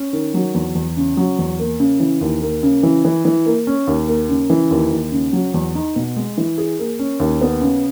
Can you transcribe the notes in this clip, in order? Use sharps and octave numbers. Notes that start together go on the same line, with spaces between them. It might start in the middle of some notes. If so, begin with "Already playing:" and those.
Already playing: C#4
D#3
F#3
E2
E2
C#3
F#3
E2
A#3
C#3
E3
D#2
A#3
C#3
E3
E3
E3
A#3
C#4
D#2
A#3
C#3
E3
D#2
D#2
C#3
F#3
E2
D#4
B2
G#3
E3
G#4
A#3
C#4
D#2
B3
C#3